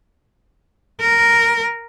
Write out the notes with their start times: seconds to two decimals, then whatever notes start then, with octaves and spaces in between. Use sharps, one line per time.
1.00 A#4